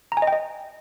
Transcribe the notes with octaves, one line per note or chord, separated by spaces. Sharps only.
A#5
G#5
D#5
G5
D#5